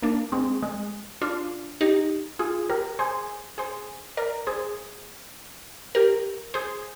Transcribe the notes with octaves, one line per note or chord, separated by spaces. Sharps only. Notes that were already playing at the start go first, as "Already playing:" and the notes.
A#3 D4
G#3 C4
G#3
D4 F4
D#4 G4
F4 G#4
G4 A#4
G#4 C5
G#4 C5
A#4 D5
G#4 C5
G4 A#4
G#4 C5